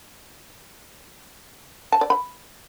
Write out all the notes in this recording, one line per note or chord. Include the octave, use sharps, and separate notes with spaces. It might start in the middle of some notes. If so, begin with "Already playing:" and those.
A5
D5
B5